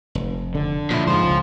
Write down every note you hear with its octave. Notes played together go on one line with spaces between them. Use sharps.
F1
D3
A#2 F3 E4
G#2 F4 C5
C#2